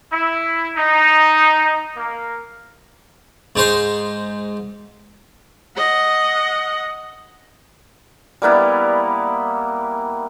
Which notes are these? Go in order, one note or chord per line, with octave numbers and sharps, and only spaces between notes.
E4
D#4
A#3
G#2 D#4 C5 C6
D#5 F#5
G3 A#3 B3 E4